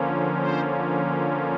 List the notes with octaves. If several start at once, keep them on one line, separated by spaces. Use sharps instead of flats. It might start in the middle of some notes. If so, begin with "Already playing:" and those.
Already playing: D3 F3 A#3 C#4
C5